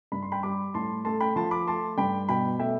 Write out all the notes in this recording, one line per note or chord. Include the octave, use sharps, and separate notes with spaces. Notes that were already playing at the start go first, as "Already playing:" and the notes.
G2 B5
C6
G5 B5
G3 B5 D6
A2 A5 C6
A3 A5 C6
G5 B5
F3 A5 C6
B5 D6
A3 A5 C6
G2 G5 B5
B2 G5 B5
A3 E5 G5